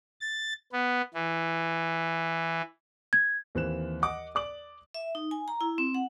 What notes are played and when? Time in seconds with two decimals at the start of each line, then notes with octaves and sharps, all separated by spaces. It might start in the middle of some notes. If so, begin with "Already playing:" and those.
0.21 A6
0.72 B3
1.14 E3
3.13 G#6
3.55 D#2 E3 C4 F#6 E7
4.02 D#5 F#5 D6 D#6
4.35 D5 D6 F#7
4.94 E5
5.15 D#4
5.31 G#5
5.48 A#5
5.61 E4
5.78 C4
5.94 F#5